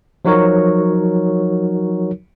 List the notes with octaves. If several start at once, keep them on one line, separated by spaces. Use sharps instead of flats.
F3 F#3 D#4 F#4 A#4 C#5